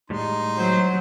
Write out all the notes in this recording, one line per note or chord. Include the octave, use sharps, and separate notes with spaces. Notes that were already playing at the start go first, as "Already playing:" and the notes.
A2 G3 G#3 D#4 C6
F#3 C5